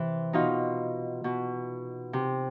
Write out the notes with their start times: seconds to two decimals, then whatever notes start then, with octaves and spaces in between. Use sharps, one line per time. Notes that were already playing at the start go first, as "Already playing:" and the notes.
Already playing: C3 E3
0.33 B2 D#4 F4
1.24 B2
2.13 C3